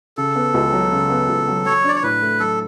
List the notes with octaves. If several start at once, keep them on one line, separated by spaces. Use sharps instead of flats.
C#3 A4
B3
C#2
F#3
C#3
B3
C#2
F#3
F#3 C#5
D4 D5
C#5
A2 B4
A3
F#3 A4